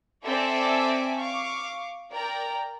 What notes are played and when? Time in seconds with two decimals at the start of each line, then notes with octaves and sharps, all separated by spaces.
0.25 C4 A4 D5 E5 G#5 D6
1.18 F5 C#6 D6
2.11 A#4 D5 G5 A#5